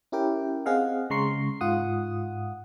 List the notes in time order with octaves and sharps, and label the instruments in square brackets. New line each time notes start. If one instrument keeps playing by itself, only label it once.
[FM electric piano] C#4 E4 G4 A#4 G5
C4 G#4 D#5 F5 F#5
C#3 G#3 A#5 C6 C#6 C7
G#2 F4 F#5 D#6